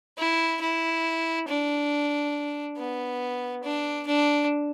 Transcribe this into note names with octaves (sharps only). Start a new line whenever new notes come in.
E4
E4
D4
B3
D4
D4